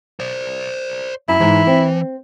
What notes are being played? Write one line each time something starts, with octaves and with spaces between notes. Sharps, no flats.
C5 D5
F#2 E4
G#2 E3
C4